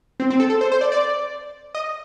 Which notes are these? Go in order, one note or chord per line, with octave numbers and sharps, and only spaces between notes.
C4
C4
A4
A4
C5
C5
D5
D5
D#5